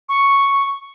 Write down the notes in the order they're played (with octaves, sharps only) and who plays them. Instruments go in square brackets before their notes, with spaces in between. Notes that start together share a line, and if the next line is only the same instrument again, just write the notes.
[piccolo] C#6